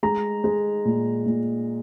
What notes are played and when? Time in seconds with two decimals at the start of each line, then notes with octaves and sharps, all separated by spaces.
0.03 G#3 A#5
0.44 G#3
0.85 A#2
1.26 A#2